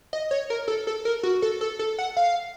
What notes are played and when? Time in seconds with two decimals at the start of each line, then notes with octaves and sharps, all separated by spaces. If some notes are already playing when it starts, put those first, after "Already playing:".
0.13 D#5
0.31 C#5
0.50 A#4
0.68 A4
0.87 A4
1.05 A#4
1.23 F#4
1.42 A4
1.61 A4
1.79 A4
1.98 F#5
2.17 F5